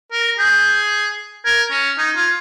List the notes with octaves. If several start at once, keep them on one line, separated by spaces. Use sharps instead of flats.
A#4
A#6
G#4 G6
A#4 G#6
C#4
D#4 G#6
F4